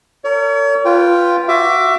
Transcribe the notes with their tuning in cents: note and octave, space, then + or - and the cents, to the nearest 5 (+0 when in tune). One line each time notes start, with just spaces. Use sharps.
A#4 -35 C#5 +40
F4 +0 B4 +0 G5 +0
F#4 +0 E5 +25 D6 +0